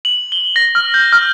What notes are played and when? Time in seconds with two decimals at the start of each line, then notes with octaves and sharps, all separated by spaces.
0.05 F#7
0.32 G7
0.56 A#6
0.75 F6
0.94 G6
1.13 F6